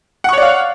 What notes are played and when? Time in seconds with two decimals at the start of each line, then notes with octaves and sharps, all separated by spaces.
0.24 F#5
0.29 C#6
0.33 C#5
0.38 D5
0.42 F5